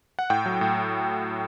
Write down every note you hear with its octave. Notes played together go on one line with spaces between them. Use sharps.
F#5
A2 G5
F#3
A2